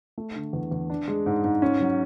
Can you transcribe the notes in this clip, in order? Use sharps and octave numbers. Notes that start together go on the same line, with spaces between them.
A3
D3
E2
E2
D4
G#3
G#2
G#2
C#4
F#3